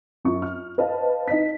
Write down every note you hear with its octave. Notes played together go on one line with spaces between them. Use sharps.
F#2 F4 C#6
F6
B4 C5 D#5 F5 A5
D#4 D#5 B6